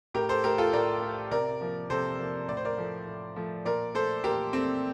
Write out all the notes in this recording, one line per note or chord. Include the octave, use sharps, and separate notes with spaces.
A2 G4 A#4
A4 C5
A3 G4 A#4
F4 A4
A2 A#4 D5
A3
C3 A#4 D5
F3 A#3
C3 A4 C5
F3 A#3
A2 D5
C5
A#4 D5
F3 A3
A2
F3 A3
A#2 A#4 D5
A3 A4 C5
A#2 G4 A#4
A3 C4